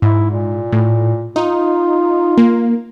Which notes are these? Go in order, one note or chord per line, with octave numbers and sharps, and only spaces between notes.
G#2 E4
A#2
A2
D#4 F4
A#3